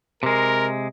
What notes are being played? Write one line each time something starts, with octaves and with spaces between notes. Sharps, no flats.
C3 G#3 A#4